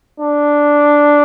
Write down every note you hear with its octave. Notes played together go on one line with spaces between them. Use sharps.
D4